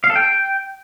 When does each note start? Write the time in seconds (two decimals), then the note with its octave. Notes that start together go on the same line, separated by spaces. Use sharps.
0.04 F5
0.10 A4
0.16 G5